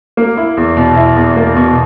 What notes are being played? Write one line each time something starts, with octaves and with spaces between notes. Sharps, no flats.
A#3
E4
E2
B2
E4
E2
A#3
B2